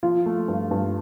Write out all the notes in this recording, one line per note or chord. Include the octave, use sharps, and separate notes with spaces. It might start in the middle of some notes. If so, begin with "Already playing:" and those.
F3 F4
A3
G2
G2